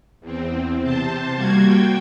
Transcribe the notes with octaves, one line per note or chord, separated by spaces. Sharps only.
E2 C4
C3 C5 A5
G3 A#3 F#4 G#6
G5